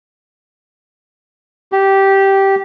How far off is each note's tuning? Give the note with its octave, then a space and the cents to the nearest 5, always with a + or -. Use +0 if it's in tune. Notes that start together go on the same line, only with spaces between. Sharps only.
G4 -10